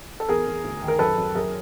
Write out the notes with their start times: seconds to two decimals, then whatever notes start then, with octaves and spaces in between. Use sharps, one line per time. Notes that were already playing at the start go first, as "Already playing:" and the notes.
0.20 A4
0.29 E2 G#4 A#4
0.46 E2
0.64 D2
0.82 D#3
0.88 A#4
0.99 F#2 A4 B4
1.17 F#2
1.35 F#2 G#4 A#4